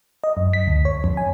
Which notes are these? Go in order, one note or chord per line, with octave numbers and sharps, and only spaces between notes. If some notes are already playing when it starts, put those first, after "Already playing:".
D#5
F#2
B6
D2
C#5
F2
G#5